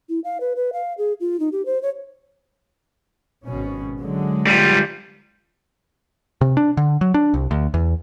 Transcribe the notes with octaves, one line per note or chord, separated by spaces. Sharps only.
E4
F5
B4
B4
F5
G#4
F4
D#4
G4
C5
C#5
G#1 B2 C#4
D3 F#3 G#3
G3 F4
C3
D4
D3
F#3
D4
C2
D2
E2